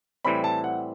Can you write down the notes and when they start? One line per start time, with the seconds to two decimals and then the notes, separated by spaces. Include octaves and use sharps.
0.25 A2 E3 G3 C4 B5
0.44 A5
0.64 F#5